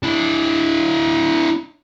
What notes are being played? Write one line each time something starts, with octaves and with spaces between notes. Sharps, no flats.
D4 E4